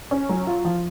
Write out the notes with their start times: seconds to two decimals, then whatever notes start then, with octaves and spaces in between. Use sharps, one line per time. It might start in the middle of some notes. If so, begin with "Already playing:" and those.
0.11 C#4
0.29 F#3
0.47 F4
0.65 F3